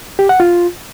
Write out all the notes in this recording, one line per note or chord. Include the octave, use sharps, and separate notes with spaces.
G4
F#5
F4